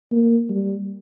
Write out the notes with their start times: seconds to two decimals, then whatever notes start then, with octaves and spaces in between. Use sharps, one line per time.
0.12 A#3
0.49 G3